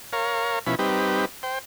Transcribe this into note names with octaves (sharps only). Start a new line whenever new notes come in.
A#4 C#5 F5
B2 F3 C#4 E4 B5
G3 C4 D#4 G4 B4
C5 G5